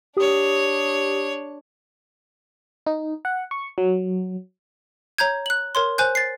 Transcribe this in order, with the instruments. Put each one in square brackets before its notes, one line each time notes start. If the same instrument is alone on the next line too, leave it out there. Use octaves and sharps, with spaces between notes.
[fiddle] D4 C#5 [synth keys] G4 D#6
[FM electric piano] D#4
F#5
C#6
F#3
[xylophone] C#5 A#5 G6 G#6
F#6 F#7
A#4 C#5 C6
C5 G#5 F#6 G6
A6 C7